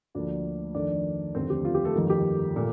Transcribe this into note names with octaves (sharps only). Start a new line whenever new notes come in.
D2 D3 F3 A#3 D4 D5
F2 D#3 A3 D4 D5
F1 D#2 D3 C4 C5
G4
F4
G4
A3 A4
G1 F2 D#3
G4
A#2 A3